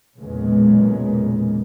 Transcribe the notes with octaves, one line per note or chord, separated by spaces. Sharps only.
B1 E2 A#2 C#3 G#3